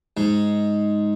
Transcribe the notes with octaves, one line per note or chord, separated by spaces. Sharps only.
G#2 G#3